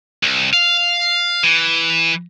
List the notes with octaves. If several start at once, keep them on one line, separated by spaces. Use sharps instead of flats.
C2
F5
E3